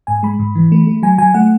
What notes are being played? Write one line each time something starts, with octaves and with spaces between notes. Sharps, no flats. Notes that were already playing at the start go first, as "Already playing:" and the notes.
G#2 G#5
G#3 B5
G#2
E3
A3
A3
F#3 G#5
F#3 G#5
A3 F#5